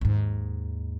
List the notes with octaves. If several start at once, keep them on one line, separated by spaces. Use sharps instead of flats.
D#2 G#2